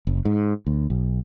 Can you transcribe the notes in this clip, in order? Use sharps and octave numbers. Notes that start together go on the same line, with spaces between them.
F#1
G#2
D2
B1